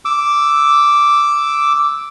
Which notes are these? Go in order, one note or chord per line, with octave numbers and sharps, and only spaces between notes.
D6 E6